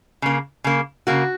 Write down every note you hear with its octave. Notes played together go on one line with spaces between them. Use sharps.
C#3 A#3
C#3 A#3
C#3 A#3 F#4